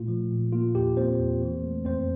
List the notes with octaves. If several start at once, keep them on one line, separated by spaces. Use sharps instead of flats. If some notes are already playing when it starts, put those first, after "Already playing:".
Already playing: A#2 A3 F4
F3
A#2
A#3 F4
E2 G4
A#3 C4 C5
E2
E3
A3
F2 C4 C5